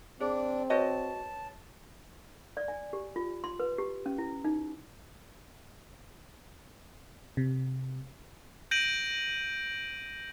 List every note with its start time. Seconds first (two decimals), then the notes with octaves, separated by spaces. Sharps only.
0.20 C4 D4 G#4 C5 D5
0.70 F#4 B4 C#5 D#5 A5
2.57 D5
2.68 G#5
2.93 G4
3.16 F4
3.44 C6
3.60 B4
3.78 G4
4.06 C#4
4.18 E4
4.44 D#4
7.37 C3
8.71 G6 A#6 D7 D#7 F#7